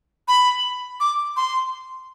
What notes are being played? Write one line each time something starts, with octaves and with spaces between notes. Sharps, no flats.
B5
D6
C6